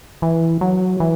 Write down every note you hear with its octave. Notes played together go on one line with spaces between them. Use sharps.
E3
F#3
E3